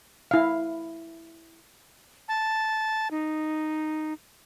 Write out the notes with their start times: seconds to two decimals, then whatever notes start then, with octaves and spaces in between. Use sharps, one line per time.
0.31 E4 F5
2.28 A5
3.11 D#4